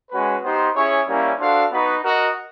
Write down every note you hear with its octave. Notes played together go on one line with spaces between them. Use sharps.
G#3 C#4 F#4 B4
B3 D#4 G4 C5
C#4 E4 G#4 C#5
G3 A#3 C#4 E4
D4 F#4 A4 C5 F5
B3 D#4 F#4 B4
F#4 A#4 D#5